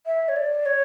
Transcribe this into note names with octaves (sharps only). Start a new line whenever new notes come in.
E5
C#5
D5
C#5